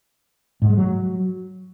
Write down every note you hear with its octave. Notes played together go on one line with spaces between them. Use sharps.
G#2
G#3
F#3